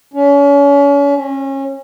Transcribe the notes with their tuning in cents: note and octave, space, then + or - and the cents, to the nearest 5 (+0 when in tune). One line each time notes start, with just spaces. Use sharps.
C#4 +35
C#4 -30